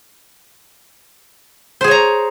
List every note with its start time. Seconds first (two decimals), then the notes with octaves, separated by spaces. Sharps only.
1.81 C5
1.84 G#4
1.88 C#5
1.91 A#5